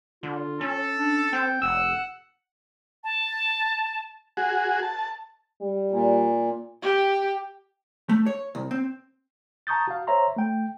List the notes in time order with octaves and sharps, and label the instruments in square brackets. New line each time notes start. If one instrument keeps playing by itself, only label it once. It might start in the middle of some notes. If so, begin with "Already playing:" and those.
[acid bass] D3 [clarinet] F4
[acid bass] C#4 [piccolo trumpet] A4
[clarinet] D4
[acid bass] C4 [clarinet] G5
[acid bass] F1 [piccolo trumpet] F#5 [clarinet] E6
[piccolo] A5
[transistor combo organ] F#4 G#4
A5
[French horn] G3
[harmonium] A#2
[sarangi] G4
[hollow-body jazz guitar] A3
C#5
C2
C4
[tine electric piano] A5 A#5 C#6 D#6 G6 A6
F#4 F5
C5 C#5 E5 A#5 C6
A3 G5